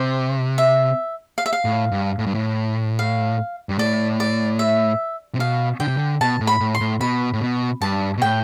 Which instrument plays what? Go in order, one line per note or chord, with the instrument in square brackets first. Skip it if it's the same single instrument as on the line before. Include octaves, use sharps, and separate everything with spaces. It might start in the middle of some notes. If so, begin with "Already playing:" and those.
Already playing: [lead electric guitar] C3 [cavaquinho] C5
[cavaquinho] E5
F5
E5
F5
[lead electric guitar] A2
G2
A2
G2
A2
[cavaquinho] F5
[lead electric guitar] G2
[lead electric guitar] A2 [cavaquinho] D5
[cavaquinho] D5
E5
[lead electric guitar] C3
[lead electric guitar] B2 [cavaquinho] F5
[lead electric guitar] D3 [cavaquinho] G5
[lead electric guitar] C3
D3
[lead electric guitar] B2 [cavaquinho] A5
[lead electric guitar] A2
[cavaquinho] B5
[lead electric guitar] A2
[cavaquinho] C6
[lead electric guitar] A2
[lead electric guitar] B2 [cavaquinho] B5
[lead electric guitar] A2
B2
[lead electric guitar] G2 [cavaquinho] A5
[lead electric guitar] B2
[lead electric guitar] A2 [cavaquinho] G5